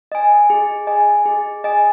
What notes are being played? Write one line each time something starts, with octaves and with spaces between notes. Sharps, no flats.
D#5 G#5
G#4
D#5 G#5
G#4
D#5 G#5